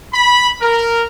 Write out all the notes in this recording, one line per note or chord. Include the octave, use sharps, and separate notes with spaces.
B5
A#4